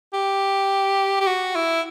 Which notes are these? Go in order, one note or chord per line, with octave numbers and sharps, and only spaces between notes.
G4
G4
F#4
E4